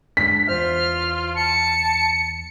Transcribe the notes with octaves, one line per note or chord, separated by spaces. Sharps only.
G#3 D4 B6
E2 F4 C5 E5 F6
A5 C#7